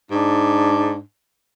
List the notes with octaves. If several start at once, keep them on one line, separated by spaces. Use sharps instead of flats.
G#2 D4